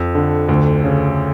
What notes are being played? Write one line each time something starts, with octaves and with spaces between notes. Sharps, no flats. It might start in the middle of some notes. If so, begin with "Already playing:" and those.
Already playing: F2
D3
D2
C#3